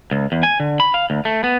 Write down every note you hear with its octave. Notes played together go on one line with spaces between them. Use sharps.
C#2
E2
G#5
D3
B5
F5
D2
A3
B3